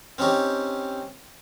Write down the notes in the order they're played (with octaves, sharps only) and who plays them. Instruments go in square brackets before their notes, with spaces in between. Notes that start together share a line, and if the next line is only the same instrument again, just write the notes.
[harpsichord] C4 C#4 D#4 G4